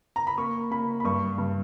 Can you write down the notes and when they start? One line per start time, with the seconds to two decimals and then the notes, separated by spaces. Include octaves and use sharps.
0.16 A#5
0.27 B5
0.38 A#3 C#6
0.71 A#3 B5
1.00 B5
1.05 G2 C#6
1.38 G2